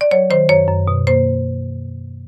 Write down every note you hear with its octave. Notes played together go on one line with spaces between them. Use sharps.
D5
F#3 C#5
D#3 C5
F#2 C#5
F#2
B2
A#3 C5